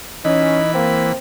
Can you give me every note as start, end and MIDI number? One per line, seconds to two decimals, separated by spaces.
0.25 1.12 52
0.25 0.59 61
0.25 0.73 63
0.25 1.12 83
0.74 1.11 58
0.74 1.17 60